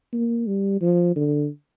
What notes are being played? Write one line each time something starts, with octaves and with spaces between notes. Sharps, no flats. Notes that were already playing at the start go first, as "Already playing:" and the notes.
A#3
G3
F3
D3